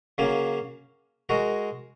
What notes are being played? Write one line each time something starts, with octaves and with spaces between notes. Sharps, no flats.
C#3 F#3 A#3 C#4
G#3 F#4 A#4